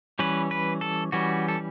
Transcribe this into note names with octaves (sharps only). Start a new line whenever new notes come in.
E3 G3 C#4 B4
B4
A4
E3 G3 C#4 F#4
A4